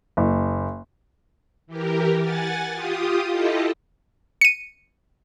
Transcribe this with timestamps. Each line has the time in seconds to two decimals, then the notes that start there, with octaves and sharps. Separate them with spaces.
0.17 F#1
1.67 E3 G4 A#4
2.20 F#5 G#5 A6
2.73 F4 G4 D#6
3.30 E4 F4 G4 A4 D#5
4.41 C#7 D#7